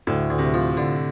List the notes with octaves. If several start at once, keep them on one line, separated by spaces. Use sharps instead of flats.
D2 A2
D2
C3
F3
D3